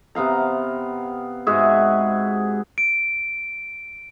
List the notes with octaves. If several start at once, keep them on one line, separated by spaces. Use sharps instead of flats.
C3 B3 F5 A#5
G#2 F#4 G#4 E5
D7